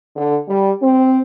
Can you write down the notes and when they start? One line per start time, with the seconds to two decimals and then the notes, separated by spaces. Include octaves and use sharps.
0.16 D3
0.48 G3
0.82 C4